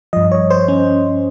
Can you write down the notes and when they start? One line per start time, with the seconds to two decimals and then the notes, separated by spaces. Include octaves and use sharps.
0.13 G2 F3 D#5
0.32 C#5
0.50 C5
0.68 C#4